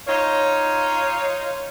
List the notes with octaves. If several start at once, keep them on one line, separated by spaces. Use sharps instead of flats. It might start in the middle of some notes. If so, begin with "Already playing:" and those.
D#4 F4 C#5